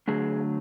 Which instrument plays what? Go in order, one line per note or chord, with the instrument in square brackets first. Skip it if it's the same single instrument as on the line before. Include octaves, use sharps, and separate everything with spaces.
[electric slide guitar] D3 F#3 A3 D4 G#4